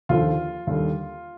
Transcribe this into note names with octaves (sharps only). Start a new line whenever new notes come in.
D#2 D3 F3 F4
D#2 D3 G3